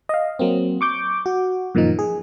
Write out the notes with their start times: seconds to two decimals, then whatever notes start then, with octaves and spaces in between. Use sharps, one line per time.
0.09 D#5 F5
0.39 F#3 A#3 C4
0.81 C#6 D6 G6
1.26 F#4
1.75 F#2 A#2 D#3 F3 D#4
1.99 G#4